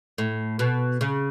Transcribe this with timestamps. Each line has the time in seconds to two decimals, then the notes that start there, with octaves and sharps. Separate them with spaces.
0.18 A2
0.59 B2
1.01 C#3